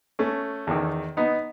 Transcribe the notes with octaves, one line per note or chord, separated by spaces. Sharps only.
A3 C#4
E2 D#3
B3 D#4